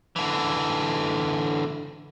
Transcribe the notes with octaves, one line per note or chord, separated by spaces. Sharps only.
D3 E3